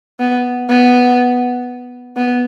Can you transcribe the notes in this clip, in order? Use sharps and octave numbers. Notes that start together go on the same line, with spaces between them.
B3
B3
B3